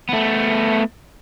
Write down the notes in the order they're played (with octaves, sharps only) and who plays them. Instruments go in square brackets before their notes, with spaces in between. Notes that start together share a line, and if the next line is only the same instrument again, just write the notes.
[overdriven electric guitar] A3 B3